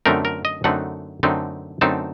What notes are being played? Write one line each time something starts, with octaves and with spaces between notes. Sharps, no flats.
F#2 D3 A3 C4 D#4 A#4
A#4
D#5
F#2 D3 A3 C4 D#4 F#5
F#2 D3 A3 C4 D#4
F#2 D3 A3 C4 D#4 A5